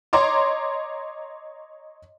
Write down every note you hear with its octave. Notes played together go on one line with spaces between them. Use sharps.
C#5 D#5 A#5 C6 D6